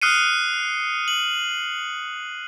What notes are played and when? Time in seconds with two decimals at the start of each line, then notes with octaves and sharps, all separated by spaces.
0.02 D#6 F6 F#6 C7 C#7 D#7
1.08 F#7